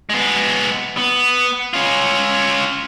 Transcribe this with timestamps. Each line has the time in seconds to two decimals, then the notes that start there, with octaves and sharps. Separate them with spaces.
0.10 G#3 B3
0.97 B3
1.74 C#4 F4